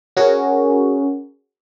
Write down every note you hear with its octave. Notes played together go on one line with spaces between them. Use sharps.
C#4 F#4 G#4 A#4